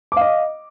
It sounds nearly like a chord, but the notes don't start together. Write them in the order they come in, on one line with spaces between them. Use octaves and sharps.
D6 F5 D#5